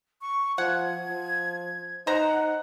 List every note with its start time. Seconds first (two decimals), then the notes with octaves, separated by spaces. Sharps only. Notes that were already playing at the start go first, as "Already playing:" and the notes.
0.21 C#6
0.58 F3 F#5 G#6
1.10 F3
2.07 D#4 C5 F#5 A#5